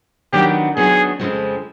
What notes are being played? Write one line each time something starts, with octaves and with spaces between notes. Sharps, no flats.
D#3 F#3 B3 D4 G4
D#3 F#3 B3 D4 G#4
F2 C#3 F3 G#3 C4